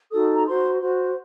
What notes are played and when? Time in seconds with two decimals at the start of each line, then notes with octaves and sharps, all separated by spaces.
0.10 D#4 F#4 A4 D#6
0.34 A#5
0.45 F#4 C5 C6
0.80 F#4 C5